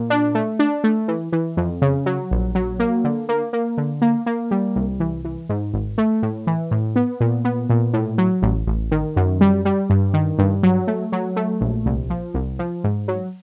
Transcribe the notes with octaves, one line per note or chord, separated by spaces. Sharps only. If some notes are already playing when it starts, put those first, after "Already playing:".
Already playing: A#2
D4
A3
D4
A3
E3
E3
F2
C#3
F#3
A#1
F#3
A#3
D3
A#3
A#3
D3
A#3
A#3
G3
C2
E3
E3
G#2
G#1
A3
A2
E3
A2
B3
A#2
B3
A#2
A2
F#3
A1
A1
D#3
F#2
G3
G3
G2
D#3
G2
F#3
A3
F#3
A3
A#1
C2
F3
C2
F3
G#2
F#3